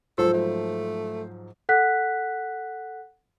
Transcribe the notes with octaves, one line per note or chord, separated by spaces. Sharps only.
G#2 F3 F#3 F4 A4 C5
A3
A4 F#5 F#6 B6